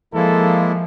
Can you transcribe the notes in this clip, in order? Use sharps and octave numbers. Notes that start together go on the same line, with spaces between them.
F3 G#3 A#3 E4 A4